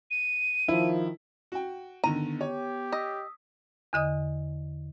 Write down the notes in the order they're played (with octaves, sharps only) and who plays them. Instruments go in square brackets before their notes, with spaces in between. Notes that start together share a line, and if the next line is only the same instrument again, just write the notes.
[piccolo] D#7
[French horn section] D#3 F3 [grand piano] E4
[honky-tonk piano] F#4 G5
[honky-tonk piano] D3 D#3 D#7 [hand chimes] B3 [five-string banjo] A#5
[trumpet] G4 [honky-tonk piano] C#5
[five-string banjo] D#5 [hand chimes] D#6 E6 B6
[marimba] E2 D3 D#5 D#6